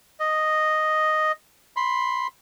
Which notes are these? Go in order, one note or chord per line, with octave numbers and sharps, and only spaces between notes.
D#5
B5 C6